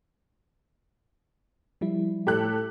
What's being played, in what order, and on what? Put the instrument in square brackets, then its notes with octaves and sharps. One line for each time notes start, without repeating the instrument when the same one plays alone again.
[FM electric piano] F3 G3 E4
[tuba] A2 [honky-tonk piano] G4 A4 F#6